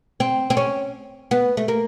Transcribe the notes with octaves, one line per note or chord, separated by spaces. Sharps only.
C4
C4
C#4
B3
A3
A#3